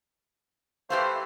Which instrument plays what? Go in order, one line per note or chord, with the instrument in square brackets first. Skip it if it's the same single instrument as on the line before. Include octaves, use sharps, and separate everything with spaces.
[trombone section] E3 A3 [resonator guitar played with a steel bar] G4 B4 F5 [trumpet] C5